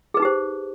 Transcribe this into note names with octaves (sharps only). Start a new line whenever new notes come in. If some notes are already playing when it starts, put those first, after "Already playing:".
D#4 G4 G#4 B4 C5